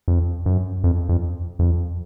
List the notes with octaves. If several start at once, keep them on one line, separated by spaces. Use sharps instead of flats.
F2
F#2
F2
F2
F2